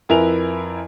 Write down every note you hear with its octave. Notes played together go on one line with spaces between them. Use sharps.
F2 E4 A#4 B4 G#5 F7